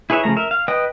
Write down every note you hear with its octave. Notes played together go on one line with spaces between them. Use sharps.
E4 G#4 B4 C#5 E5
C#3 F3 A3 A#5
A#4 E5
F5
B4 D#5 G5 D#6